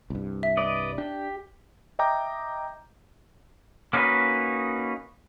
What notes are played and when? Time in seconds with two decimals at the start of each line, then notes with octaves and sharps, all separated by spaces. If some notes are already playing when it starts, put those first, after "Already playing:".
0.10 C2 G2
0.43 E5
0.57 B4 D5 D#5
0.98 D4 G4
1.99 D#5 E5 G5 A#5 D6 G6
3.93 A#3 C#4 D#4 E4 F#4 B4